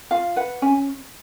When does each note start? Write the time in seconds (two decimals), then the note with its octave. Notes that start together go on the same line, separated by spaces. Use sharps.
0.11 F4 F5
0.36 B4 F#5
0.62 C#4 G#5